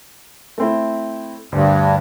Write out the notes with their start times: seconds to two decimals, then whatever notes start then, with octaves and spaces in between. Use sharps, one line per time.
0.58 A3 C4 E4
1.52 D2 G2